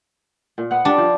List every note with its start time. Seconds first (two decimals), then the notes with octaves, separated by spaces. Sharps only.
0.58 A#2
0.71 B3 F#5
0.85 G3 D4
0.98 F3